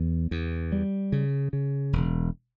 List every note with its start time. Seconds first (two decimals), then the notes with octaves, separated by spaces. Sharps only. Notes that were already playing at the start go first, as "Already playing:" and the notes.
Already playing: E2
0.31 E2
0.72 G3
1.12 C#3
1.53 C#3
1.93 E1